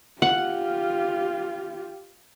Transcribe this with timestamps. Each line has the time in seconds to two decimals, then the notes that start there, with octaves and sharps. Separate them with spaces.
0.22 F4 G4 F#5